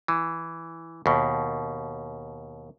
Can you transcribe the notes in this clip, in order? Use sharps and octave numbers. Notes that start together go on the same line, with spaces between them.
E3
D#2 B2